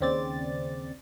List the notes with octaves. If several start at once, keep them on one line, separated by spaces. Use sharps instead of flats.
D#2 C#3 C4 D5 A6